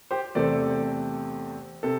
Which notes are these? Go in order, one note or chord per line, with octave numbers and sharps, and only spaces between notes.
G4 C5
E2 C3 A3 C4 A4 D5
C3 A4